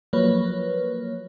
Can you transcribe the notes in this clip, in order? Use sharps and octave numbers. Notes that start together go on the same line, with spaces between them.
F3 F#3 A#3 B4 C#5